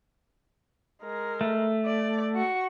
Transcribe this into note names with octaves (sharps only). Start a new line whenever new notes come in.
G#3 A#4
A3
D5
F#4 C#6